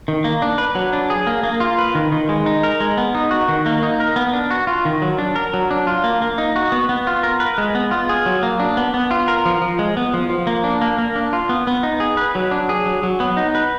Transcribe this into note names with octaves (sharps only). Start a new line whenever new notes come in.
D#3
A#3
D4
B4
F#3
D4
G#4
A#3
A#3
F4
B4
D#3
D#3
G#3
D#4
A#4
G#3
B3
D#4
F#4
D#3
A#3
D#4
A#4
B3
D4
F#4
F4
D#3
F#3
D4
A#4
F#3
D4
F4
A#3
A#3
D#4
F#4
B3
B3
F4
A#4
B4
G#3
B3
F4
G#4
F#3
A#3
D4
B3
B3
F4
A#4
F3
F3
G#3
B3
F3
F3
A#3
D4
A#3
A#3
D4
F4
B3
B3
D#4
G#4
B4
F#3
D4
G#4
F#3
F#3
B3
D#4
B4